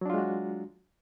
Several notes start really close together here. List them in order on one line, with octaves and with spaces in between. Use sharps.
F#3 D4 F4 G#3 F#4